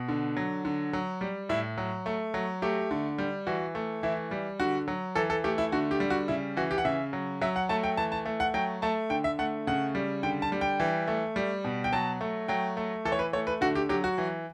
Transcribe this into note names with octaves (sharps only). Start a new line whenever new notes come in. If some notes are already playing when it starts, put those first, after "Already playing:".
Already playing: B2
D3
F#3
D3
F#3
G3
A2 E4
F#3
A3
F#3
A3 G4
D3
G3
E3 F#4
A3
E3 E4
G3
D3 F#4
F#3
E3 A4
A4
A3 G4
E4
D3 F#4
G4
G3
F#4
C#3 E4
E3 F#4
G4
F#5
C#3 E5
F#3
F#3 E5
F#5
A3 A5
G5
E3 A5
A5
A3
F#5
F#3 G5
A3 A5
D3 G5
E5
A3 F#5
C#3 F#5
G3
D3 G5
A5
G3
G5
E3
A3
G3
B2
G5
F#3 A5
A3
F#3 G5
A3
E3 A4
C#5
B4
A3 C#5
B4
D3 F#4
G4
F#3 G4
F#4
E3